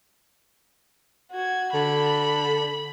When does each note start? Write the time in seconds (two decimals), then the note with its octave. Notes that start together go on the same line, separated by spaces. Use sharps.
1.32 F#4 G#6
1.74 D3 B5